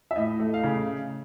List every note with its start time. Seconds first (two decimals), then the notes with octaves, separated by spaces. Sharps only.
0.11 E5
0.16 A2 D#5
0.40 A3
0.54 F5
0.64 C#3